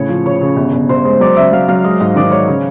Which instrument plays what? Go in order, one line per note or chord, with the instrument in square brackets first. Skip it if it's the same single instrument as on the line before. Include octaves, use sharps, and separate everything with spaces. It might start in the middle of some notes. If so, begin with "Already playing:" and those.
Already playing: [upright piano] A2 C#3 [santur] C#5
[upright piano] F3
[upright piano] C#3 [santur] C#5
[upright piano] C#3
G1
G1
[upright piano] G1 [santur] C5
[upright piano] G#3
[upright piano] F#3 [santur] D5
[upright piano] C#3 [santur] E5
[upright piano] F#3 [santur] F5
[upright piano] F#3 [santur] F5
[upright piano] G#3 [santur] D#5
[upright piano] G#2 [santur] D#5
[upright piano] D#3 [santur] D5
[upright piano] G#3 [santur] C#5
[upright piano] C#3